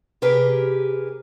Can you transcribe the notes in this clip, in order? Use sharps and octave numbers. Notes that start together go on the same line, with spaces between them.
C3 G4 G#4 A#4 B4